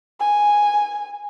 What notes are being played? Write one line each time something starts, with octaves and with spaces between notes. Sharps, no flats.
G#5